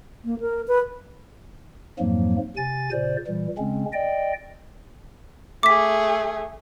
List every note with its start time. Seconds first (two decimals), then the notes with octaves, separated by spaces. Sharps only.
0.25 A#3
0.40 A#4
0.68 B4
1.99 F2 G#2 F3 F#3 A#3
2.57 C3 G#5 A6
2.91 A#2 C#3 C5 D5
3.27 A#2 E3 G3
3.58 C#3 G#3 C4 C#4
3.93 D5 D#5 G5
5.63 A3 G#4 D6 B6